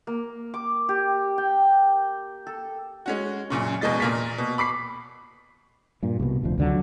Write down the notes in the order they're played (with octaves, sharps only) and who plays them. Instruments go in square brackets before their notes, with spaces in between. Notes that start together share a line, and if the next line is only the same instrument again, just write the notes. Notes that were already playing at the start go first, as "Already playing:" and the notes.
[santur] A#3
D6
G4
G5
A4
[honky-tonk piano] G#3 C#4 F#4
F#2 A#2 C#3
A#1 E2 B2 G#3 D#5 A6
A#2 A#3 B6
B2
B5 D6 B6 C7
[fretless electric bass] G2 A#2
C2 B2
F1 D2 F3
C#2 D3 F#3